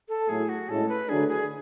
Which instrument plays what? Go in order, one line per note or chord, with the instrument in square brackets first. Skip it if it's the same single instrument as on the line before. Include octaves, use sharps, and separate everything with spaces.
[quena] A4
[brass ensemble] A2 F#3 A3 E4 [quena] G#4
[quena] F#4
[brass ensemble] A2 G#3 C#4 E4 [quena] A4
[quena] B4
[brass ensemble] D3 F#3 A3 D4 [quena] G#4
[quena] G#4